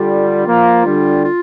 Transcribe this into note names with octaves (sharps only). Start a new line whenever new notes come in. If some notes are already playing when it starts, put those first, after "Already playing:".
Already playing: D3 G3 F4
F3 A#3
D3 G3
F4